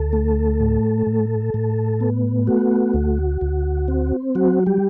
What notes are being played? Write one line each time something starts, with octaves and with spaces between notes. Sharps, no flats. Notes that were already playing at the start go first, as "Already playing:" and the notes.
Already playing: D2 A4
A3
A2
A2
A2
B3
A3 F#4
D2
D2
C4
F#3 F#4
G3 G4